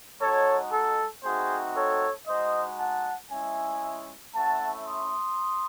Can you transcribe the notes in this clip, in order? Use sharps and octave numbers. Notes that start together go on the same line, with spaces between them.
G#3 D#4 F#4 A4 C#5
A4
A3 C4 D#4 F#4 G#4 C5
A4 C#5
G#3 D#4 F#4 C5 D#5
F#5 A5
G#3 C#4 E4 E5 G#5
A3 C#4 E4 F#5 A5
C6 D#6